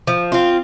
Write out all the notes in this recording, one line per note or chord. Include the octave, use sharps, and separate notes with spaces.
F3
C4 F4